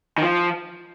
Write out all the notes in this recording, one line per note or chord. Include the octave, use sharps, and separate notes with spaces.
D#3
F3